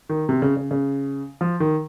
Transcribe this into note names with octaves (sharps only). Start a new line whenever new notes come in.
D#3
C3
C#3
C#3
C#3
F3
D#3